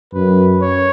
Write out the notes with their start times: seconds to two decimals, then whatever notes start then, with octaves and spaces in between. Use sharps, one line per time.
0.13 F#2 B4
0.62 C#5